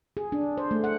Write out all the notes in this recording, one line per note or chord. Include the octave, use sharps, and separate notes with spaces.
G#4
D4
C5
A3
F#5